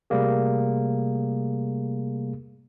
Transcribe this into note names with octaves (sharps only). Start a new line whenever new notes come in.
C3 G3 A3 A#3 G#4